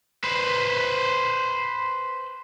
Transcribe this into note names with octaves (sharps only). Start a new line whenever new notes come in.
B4 C5